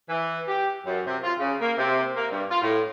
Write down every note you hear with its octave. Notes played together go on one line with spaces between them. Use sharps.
E3
G4
F#2
C3
F4
C#3
A#3
C3
A#3
G2
F4
A2